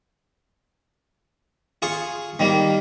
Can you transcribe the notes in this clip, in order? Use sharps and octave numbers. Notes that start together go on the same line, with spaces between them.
F4 G#4 C#6
D#3 G3 A#3